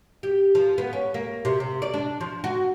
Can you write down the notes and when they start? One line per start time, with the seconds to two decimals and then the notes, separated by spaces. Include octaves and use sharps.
0.23 G4
0.55 F3
0.78 B3
0.93 C#4
1.14 A#3
1.45 C3
1.60 C3
1.82 D5
1.94 D4
2.21 F3
2.44 F#4